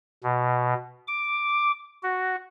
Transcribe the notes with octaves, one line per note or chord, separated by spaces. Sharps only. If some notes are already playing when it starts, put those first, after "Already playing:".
B2
D6
F#4